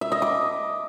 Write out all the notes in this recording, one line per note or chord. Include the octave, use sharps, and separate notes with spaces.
E5
D#5
D6